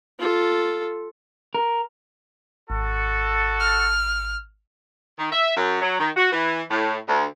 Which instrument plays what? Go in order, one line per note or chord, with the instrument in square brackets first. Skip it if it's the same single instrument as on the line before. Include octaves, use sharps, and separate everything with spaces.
[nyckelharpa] F4 A4
[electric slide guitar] A#4
[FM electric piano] G#1 [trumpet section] F#4 A4
[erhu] F6
[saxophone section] D#3
E5
F#2
F#3
D#3
F#4
E3
A2
D2